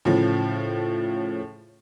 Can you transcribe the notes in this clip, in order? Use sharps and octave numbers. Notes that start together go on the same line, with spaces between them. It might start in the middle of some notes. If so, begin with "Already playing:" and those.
A2 C#3 F3